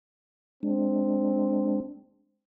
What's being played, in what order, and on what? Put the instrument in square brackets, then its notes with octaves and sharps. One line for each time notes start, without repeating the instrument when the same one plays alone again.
[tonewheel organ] G#3 D4 [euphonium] C4